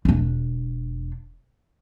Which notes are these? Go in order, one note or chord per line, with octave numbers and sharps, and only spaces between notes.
E1 D4